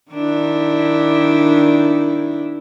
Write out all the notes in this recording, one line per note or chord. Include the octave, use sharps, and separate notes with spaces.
D#3 D4 E4